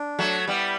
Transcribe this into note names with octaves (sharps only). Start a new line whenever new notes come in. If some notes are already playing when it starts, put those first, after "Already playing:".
Already playing: D4
F#3 A3
G3 B3 E4